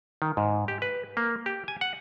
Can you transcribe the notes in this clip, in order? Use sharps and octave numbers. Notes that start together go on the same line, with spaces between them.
D#3
G#2
G4
B4
A#3
G4
G#5
F#5